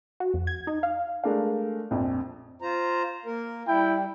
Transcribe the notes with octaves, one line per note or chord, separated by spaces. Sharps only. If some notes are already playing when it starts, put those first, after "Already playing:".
F#4
F2
G#6
D#4
F5
G#3 A3 D4 A#4 F5
A#1 F2
F4 C5 A#5
A#3 A#4
G3 E4 G5